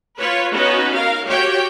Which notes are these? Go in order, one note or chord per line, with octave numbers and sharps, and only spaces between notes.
F4 B4 C#5
B3 C#4 D#4 F#4 B4
A#4 F5
F#4 G4 C#5 G5